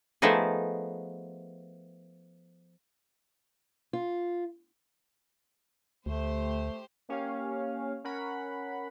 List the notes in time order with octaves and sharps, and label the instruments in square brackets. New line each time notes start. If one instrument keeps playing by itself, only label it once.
[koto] F3 A3 B3 D#4 G#4
[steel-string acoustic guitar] F4
[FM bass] D2 [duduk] A3 [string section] G4 C5
[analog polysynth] A#3 C#4 G4 C#5 F5 G#5
C#4 A#4 F#5 B5